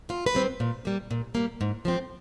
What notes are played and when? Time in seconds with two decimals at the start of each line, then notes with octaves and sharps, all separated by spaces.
0.09 F#2 F4
0.26 B4
0.34 D#3 G3 C4
0.60 A#2
0.85 G3 A#3
1.11 A#2
1.35 G3 A#3
1.61 G#2
1.85 F3 A3 C4